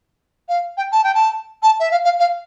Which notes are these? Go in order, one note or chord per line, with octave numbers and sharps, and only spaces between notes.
F5
G5
A5
G5
A5
A5
E5
F5
F5
F5